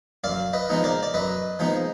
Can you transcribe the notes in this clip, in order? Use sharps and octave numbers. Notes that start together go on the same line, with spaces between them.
F#2 D5 F5
B4 D#5
F3 G#3 B3 D#4
A#4 D5
D5
F#2 B4 D#5
F3 G#3 B3 D#4